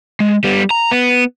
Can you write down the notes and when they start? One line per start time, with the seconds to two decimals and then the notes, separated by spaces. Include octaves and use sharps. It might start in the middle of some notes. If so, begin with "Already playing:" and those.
0.20 G#3
0.44 G3 B3
0.70 A#5
0.91 B3